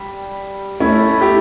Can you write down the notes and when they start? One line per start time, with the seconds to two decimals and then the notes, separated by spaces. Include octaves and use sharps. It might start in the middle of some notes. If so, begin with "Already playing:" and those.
Already playing: G3
0.80 A3 C#4 E4
1.21 E4 G4